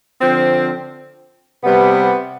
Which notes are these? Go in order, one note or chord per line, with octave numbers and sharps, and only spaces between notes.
D3 F3 C4
C3 G3 B3